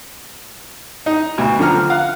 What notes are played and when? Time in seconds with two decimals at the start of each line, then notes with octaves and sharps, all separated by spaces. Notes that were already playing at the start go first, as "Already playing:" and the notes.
1.06 D#4
1.38 D2 B2
1.59 D3 F3 A#5 F6
1.90 F5 F#5